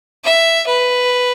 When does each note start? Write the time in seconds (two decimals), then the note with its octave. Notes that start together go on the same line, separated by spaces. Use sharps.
0.24 E5
0.66 B4